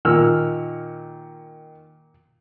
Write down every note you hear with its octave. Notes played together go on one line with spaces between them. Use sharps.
A#2 D#3 E6 F6